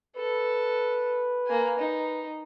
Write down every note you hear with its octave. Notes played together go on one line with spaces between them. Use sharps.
A4 B4
A#3 G#5
D#4